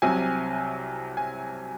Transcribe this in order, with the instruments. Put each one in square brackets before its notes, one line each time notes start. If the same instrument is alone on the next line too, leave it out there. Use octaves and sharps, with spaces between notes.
[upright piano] C2 C3 F#3 G#5
G#5